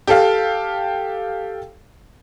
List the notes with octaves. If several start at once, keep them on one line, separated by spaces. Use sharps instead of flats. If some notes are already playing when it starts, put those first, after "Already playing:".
G4 A4 F5